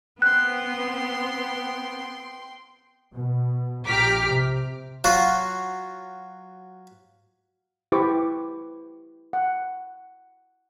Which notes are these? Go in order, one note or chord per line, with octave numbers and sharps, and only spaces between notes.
B3 C4 G5 C6 F#6
B2
A#1 G4 A#5 D6 F6 B6
C3
F#3 F4 F#4
E4 G4 B4 C5 C#6 D6
F#5